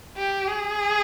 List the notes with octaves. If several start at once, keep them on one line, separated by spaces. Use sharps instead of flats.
G4
G#4